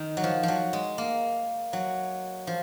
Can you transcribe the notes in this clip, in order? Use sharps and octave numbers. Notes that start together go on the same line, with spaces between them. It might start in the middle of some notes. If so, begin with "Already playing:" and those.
Already playing: D#3
F#3
F3
F3 F#3
G#3
A#3
F#3
F3